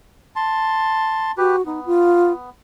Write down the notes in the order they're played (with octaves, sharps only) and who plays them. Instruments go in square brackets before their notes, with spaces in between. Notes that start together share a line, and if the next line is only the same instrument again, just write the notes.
[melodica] A5 C6
[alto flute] F#4 [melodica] G4 B4
[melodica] B3 [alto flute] D#4
[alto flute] F4